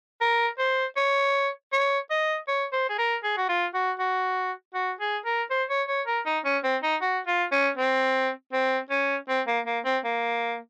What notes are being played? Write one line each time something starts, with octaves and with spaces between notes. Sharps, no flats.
A#4
C5
C#5
C#5
D#5
C#5
C5
G#4
A#4
G#4
F#4
F4
F#4
F#4
F#4
G#4
A#4
C5
C#5
C#5
A#4
D#4
C#4
C4
D#4
F#4
F4
C#4
C4
C4
C#4
C4
A#3
A#3
C4
A#3